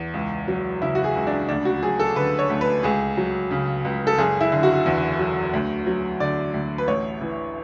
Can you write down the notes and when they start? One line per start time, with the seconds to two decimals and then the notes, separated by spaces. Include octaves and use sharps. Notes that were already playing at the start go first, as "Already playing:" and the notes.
Already playing: E2
0.14 C#2
0.48 F#3
0.82 C#3 E4
0.95 F#4
1.04 G#4
1.16 C#2
1.27 D4
1.49 D2 D4
1.65 F#4
1.83 F#3 G#4
2.00 A4
2.16 D3 B4
2.39 C#5
2.50 D2
2.61 B4
2.83 C#2 G#4
3.17 F#3
3.51 C#3
3.85 C#2
4.07 A4
4.18 F#1 G#4
4.41 E4
4.52 D3
4.63 F#4
4.86 E2
5.19 F#3
5.53 D2
5.87 F#3
6.20 D3 D5
6.54 D2
6.78 B4
6.88 A1 C#5
7.21 E3